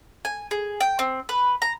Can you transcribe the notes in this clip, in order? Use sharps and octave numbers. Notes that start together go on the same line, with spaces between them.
G#5
G#4
G5
C4
B4
A#5